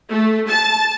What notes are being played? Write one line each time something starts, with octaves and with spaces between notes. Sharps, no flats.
A3
A5